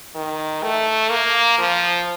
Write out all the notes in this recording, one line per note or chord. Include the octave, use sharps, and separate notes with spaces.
D#3
A3
A#3
F3